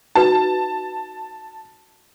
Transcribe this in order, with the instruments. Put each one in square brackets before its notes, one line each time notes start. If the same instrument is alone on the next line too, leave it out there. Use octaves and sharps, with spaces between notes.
[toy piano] D#4 F#4 B4 [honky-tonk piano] A5